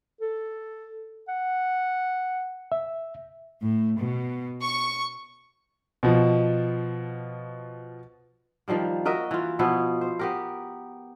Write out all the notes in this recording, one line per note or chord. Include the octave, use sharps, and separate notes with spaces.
A4
F#5
E5
A2
B2
C#6
B2 F3
D#3 F3 G3 A#3
F#4 A#4 D#5 E5
E3 F4
B2 F3 B3 E4
C5
B3 G4 A#4